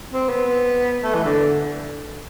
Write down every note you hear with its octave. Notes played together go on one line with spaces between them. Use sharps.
C4
B3
A3
E3
D3